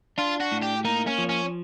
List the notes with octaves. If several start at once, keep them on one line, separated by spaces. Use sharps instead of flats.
D4 F4
F#4
A2
G4
A#3 D#4
C#4
F3
C#4